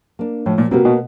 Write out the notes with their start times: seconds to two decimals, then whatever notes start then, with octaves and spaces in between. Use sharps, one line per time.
0.19 A#3 D4
0.46 A2 F3
0.58 A#2
0.71 C3 A#3 C#4 F#4 B4
0.85 B2